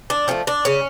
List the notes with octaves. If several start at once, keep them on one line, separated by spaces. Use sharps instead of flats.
D4
F3 A3 C#4
D4
C#3 C#4